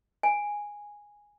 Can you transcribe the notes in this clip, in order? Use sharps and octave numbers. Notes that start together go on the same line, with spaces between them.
G#5